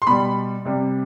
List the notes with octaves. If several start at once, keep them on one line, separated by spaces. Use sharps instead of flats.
C6
B2 G3 B5
C3 G3